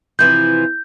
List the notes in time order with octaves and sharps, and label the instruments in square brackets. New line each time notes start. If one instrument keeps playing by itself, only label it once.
[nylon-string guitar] C3 E3 F3 [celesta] G6